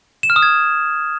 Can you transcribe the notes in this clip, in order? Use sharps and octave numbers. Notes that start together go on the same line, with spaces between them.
E7
F6
D#6
G#6